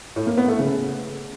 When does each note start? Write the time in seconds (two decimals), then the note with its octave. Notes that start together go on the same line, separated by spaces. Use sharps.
0.16 A2
0.27 A#3
0.37 B3
0.48 A3
0.59 C#3